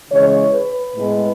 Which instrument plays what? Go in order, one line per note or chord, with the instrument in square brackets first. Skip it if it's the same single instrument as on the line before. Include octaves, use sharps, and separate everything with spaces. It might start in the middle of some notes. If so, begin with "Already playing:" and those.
[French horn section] C#3 E3 G#3 C#5
B4
A2 G#3 B3